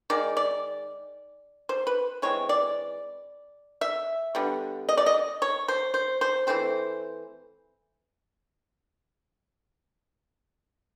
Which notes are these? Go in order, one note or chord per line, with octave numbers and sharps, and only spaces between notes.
D#3 G#3 D5
D5
C5
B4
E3 G#3 C4 C#5
D5
E5
D3 G3 B3
D#5
D5
D#5
C#5
C5
C5
C5
E3 A3 C4 C5